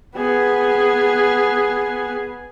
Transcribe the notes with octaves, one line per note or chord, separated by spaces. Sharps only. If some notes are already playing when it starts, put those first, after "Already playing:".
B3 G#4